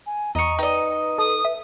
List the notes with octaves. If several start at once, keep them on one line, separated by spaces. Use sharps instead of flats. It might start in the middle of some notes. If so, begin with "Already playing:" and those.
G#5
E2 D#5 A#5 C#6
D#4 B4 D5 D#5 G5
A4 D#6
E5